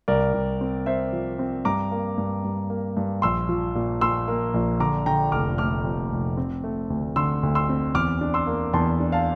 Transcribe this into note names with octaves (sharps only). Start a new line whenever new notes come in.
C2 A#4 D5
C2
C4
C4 C5 E5
F3
C4
G2 A#5 D6
A#3
G2
G2
A#3
G2
A#1 C6 E6
F3
A#2
A#2 C6 E6
A#3
A#1
D3 A#5 D6
D3 G5 A#5
F1 D6 F6
A3 D6 F6
F2
F1
C4
A3
D2
D3 C6 E6
D2
C6 E6
C4
E2 D6 F6
D4
C6 E6
A#3
E2 A5 C6
D4
F5 A5